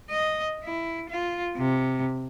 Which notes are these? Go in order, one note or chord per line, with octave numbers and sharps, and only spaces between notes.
D#5
E4
F4
C3